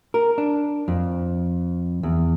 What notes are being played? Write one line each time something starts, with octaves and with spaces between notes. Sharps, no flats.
A#4
D4
F2
E2